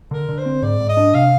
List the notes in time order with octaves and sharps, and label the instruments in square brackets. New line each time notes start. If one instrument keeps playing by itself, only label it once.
[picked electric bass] D3 [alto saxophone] A#4
[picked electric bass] D3
[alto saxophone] C5
[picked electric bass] C4
[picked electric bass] G#2 [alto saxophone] D5
[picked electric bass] G#2
[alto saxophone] D#5
[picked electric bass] D4
[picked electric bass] C3 [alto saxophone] F5